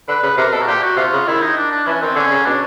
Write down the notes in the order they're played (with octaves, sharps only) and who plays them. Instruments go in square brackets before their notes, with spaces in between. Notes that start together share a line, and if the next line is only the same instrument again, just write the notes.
[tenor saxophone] D3 [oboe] B4
[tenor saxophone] C#3 [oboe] B4
[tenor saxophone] C3 [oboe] A#4
[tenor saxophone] B2 [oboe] A4
[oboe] F#4
[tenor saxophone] A#2 [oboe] G4
[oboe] F#4
[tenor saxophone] C3 [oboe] F4
[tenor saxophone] C#3
[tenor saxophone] D#3 [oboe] E4
[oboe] D#4
D4
D4
[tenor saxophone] E3 [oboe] C#4
[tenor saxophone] D#3 [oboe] C4
[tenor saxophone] D3 [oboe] C#4
[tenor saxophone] C#3
[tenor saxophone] B2 [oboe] D4